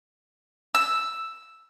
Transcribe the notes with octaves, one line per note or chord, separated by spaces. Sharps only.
E6